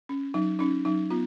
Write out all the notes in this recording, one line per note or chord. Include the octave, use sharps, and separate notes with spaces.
C#4
F#3 D#4
C#4 D#4
F#3 D#4
B3 F4